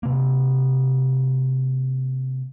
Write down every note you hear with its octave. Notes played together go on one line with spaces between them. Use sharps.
C3 A#3